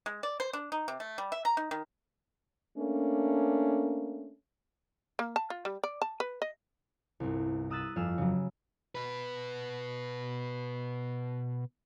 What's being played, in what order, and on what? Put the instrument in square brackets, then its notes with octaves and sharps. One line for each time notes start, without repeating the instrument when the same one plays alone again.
[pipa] G#3
D5
C5
D4
D#4
C3
A3
G3
E5
A#5
D#4
D#3
[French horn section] A3 A#3 C#4 D4
[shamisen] A#3
A5
F4
G3
D5
A5
B4
D#5
[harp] G1 C2
A#5 D#6 E6 F#6 A6 B6
G1 F2 G#4 E6 F6
C#3 F#3
[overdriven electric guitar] B2 B4